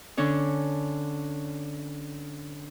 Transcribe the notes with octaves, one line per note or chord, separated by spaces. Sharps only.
D3 C#4 D4 C#5